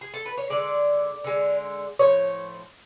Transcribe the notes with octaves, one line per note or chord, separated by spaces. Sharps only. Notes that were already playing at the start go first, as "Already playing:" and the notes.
G#4
A4
B4
C#5
D3 G#3 D5
D3 G#3
A2 F3 C#5